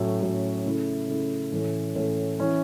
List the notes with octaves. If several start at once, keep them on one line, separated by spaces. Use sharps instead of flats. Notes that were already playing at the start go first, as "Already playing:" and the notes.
Already playing: A2 F#3 C#4
A2 F#3 C#4
C#3 A3 E4
C#3 A3 E4
A2 E3 A3 C#4
A2 E3 A3 C#4
E3 C#4 E4